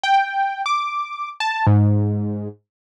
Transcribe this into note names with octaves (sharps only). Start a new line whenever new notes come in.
G5
D6
A5
G#2